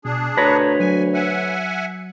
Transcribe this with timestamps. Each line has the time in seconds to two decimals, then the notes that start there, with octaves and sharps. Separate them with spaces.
0.05 B2 D4 G#4
0.37 D2 B4 C#5 A5 A#5 A#6
0.80 F#3 G#5
1.14 E5 F#5 G#5